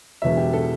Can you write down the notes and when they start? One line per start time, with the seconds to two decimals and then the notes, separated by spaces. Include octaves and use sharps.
0.22 E1 E2 B2 F#3 E5
0.37 G4
0.53 A4